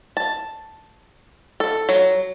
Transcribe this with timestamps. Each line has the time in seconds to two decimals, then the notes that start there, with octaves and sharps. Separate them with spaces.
0.17 A5
1.60 A4
1.89 F#3